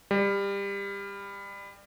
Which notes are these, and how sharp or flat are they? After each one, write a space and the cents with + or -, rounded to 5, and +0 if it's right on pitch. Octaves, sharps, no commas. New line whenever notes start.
G3 +25